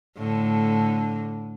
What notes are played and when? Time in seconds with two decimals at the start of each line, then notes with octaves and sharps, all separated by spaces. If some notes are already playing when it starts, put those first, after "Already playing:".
0.17 A2 D3